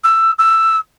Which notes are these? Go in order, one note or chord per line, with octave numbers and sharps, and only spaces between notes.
E6
E6